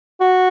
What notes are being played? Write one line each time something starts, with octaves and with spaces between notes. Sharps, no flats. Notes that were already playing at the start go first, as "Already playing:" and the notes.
F#4